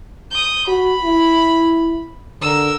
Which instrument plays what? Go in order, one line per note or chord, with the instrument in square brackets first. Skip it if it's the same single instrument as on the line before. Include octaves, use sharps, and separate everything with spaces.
[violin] D#6 G6
[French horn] F#4 [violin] B5
[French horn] E4
[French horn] D3 [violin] A#4 E6